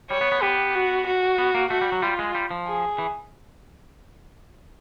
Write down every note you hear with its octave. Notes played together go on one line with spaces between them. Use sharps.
G3 C#5
B3
B3
B3 G4
F#4
F#4
B3
A#3
A3 F#4
G3
F#3
G3 F4
G#3
G3
F3
G#4
E3